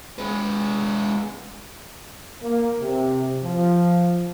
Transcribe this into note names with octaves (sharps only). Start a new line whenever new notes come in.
G#3 B4
A#3
C3
F3